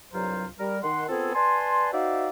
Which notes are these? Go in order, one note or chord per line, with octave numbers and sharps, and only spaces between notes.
C2 G2 F#3 F4 C5 A#5
G3 A#4
D#3 F#5 C6
B3 C4 F4 G#4 A4
B4 D5 G#5 A5 C6
D#4 F#4 C5 D5 E5 F5